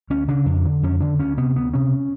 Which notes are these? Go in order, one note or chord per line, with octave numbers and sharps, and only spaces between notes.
D2 C#4
C#3 D4
F2
D3
F2 C#4
D3 D4
D2 C#4
C3 B3
D2 B3
C3 C#4